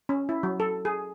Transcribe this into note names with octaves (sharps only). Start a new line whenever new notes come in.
C#4
E4
F#3
A4
G#4